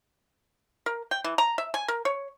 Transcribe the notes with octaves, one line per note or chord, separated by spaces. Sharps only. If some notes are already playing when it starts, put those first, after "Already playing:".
A#4
G5
E3
A#5
E5
G#5
A#4
C#5